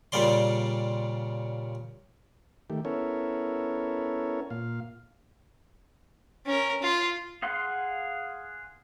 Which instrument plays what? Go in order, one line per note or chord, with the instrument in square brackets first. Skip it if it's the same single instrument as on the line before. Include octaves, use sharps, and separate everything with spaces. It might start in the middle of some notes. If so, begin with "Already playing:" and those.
[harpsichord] A#2 C#3 G3 D5 C6
[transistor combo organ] D#3 A3 G4
B3 C#4 E4 A4 A#4 C#5
A#2 F5
[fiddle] C#4 A#4
F4
[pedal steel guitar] G#4 F5 F#5 C6